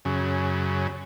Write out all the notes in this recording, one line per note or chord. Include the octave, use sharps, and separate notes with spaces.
F#2 C#3